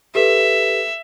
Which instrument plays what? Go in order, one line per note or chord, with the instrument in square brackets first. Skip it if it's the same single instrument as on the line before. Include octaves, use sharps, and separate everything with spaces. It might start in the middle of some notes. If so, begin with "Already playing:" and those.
[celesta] G4 A4 B4 [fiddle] E5